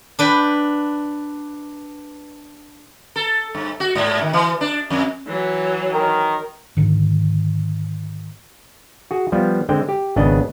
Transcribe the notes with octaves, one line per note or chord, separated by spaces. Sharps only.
D4 B4 G5
A4
G2
F#4
G#2
D#3
E3
D4
F2
E3 F#3
D#3 A#4
G#2 D3 D#3
F#4 G#4
F3 G3 B3
D3 G#3 C4 G5
G4
G#1 C#3 B3 D4 D#5 F#5